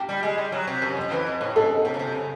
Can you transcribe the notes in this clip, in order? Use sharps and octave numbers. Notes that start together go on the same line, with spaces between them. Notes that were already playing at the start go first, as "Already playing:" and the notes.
Already playing: G4
G3
G#3
G3
F#3
C3
F#2
F2
E3
F2
A2
G#2 A4
C3
C#3
C3
C#3